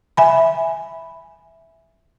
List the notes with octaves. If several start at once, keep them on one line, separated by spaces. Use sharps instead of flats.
E5 G#5 B5